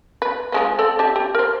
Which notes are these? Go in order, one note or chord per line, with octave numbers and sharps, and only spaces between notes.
B4
F3 G#3 B3
C4 A4 D5
G4 E5 A5
G4
A#4 C5